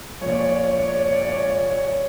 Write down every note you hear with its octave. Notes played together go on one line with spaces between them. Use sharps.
A#2 F3 C#5
D5
C#5
D5
C#5
D5
C#5
D5
C#5
D5
C#5
D5
C#5
D5
C#5
D5
C#5
D5
C#5
D5
C#5